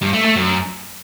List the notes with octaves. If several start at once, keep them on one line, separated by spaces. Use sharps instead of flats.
G2
A3
A3
F#2